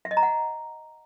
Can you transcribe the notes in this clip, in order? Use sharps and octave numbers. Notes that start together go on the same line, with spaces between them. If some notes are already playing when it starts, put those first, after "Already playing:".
E5
D#5
A#5
F#5